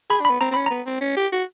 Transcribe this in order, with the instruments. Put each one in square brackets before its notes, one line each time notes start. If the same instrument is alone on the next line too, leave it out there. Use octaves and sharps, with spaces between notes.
[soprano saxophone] G#4 [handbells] B5
[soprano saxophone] D4
[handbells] B5
[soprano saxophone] B3
[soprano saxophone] C4 [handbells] A#5
[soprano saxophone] C4
[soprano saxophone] C#4 [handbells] B5
[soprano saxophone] B3 [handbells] A#5
[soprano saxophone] C4
C#4
G4
F#4